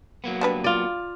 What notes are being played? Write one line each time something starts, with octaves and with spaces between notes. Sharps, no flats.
F#3 A#3 B3
G3 D4 B4
F4 D5